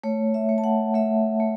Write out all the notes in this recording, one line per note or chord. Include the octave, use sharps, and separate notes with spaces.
A3 C#5
E5
A3
A5
F#5
A3 E5
A3